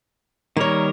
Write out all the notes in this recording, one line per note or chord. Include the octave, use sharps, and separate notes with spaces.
D#3 G3 A#3 A#4 C#5